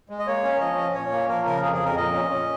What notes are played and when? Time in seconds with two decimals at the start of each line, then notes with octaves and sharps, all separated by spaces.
0.09 G#3
0.19 D#5
0.27 A#3 C#5
0.44 C#4
0.60 F3 D#5
0.78 C#4
0.94 A#2 C#5
1.12 A#3
1.29 F3 A#4
1.45 C#3 A#4
1.63 F2 G#4
1.74 G#4
1.80 F2
1.85 A#4
1.97 A#2 D#5
2.14 C#4
2.31 C#4